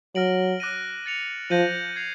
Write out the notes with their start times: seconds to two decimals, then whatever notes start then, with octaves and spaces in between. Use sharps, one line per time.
0.15 F#3 F6 A#6 D7 F#7
0.60 D6 F#6 A#6 D#7
1.06 A6 C#7 F7
1.50 F3 G6 A#6 D#7 F#7
1.96 G#6 C7 F7